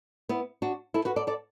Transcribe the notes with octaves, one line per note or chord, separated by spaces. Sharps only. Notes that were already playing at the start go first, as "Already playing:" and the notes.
B3 E4
D4 F#4
E4 A4
F#4 B4
A4 D5
A4 D5